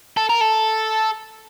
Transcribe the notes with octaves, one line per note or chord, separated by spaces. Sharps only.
A4
A#4
A4